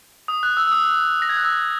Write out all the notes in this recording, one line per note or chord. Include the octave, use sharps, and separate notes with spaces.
D#6
F#6
E6
E6
D#6
A#6
G#6
F#6
E6